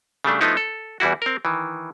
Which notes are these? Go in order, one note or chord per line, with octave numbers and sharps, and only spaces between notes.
C#3 G3 A3 D4
F3 A3 B3 D#4 E4
A4
E2 E3 G3 E4 F#4
C4 A#4
D#3 E3